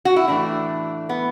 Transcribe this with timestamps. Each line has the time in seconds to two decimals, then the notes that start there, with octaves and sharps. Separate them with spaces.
0.05 F#4
0.16 E4
0.28 A2 E3 A3 D4
1.09 B3